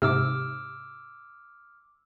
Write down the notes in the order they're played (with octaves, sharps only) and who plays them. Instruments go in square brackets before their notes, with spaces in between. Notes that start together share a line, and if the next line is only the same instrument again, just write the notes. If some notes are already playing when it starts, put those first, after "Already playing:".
[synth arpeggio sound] G#2 C3 [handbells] D6 E6 F6